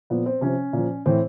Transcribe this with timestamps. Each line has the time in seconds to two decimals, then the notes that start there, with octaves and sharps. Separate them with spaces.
0.10 A#2 F3 B3
0.26 C4
0.41 C3 F3 C#4
0.73 A#2 F3
1.06 A2 E3 C4